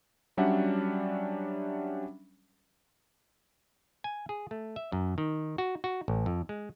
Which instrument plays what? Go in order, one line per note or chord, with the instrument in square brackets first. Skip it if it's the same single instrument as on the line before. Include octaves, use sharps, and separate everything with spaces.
[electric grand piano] F#3 G3 C#4 D4 E5 F#5
[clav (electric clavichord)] G#5
G#4
A3
E5
F#2
D#3
F#4
F#4
A1
F2
G#3